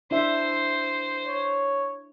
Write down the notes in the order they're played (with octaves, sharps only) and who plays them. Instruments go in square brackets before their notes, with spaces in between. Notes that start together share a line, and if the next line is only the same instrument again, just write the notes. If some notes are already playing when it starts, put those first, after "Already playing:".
[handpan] D4 E4 E5 [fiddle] C5
[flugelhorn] C#5